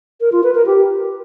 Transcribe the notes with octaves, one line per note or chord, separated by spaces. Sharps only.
A#4
F4
B4
A#4
G4